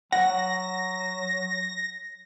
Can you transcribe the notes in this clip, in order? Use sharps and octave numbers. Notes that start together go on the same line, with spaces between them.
F#3 F#5 A#6